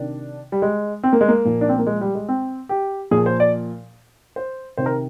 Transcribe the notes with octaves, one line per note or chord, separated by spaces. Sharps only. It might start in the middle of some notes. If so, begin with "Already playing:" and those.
Already playing: C3 D#3 D4
G3
G#3
C4
A#3
G#3
A#3
A#2 F3
D4
C4
A#3
G#3
G3
G#3
C4
G4
A#2 F3 G#4
C5
D5
C5
C3 D#3 C5
A#4